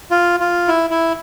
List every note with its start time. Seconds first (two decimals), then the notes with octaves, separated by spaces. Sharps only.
0.11 F4
0.40 F4
0.68 E4
0.90 E4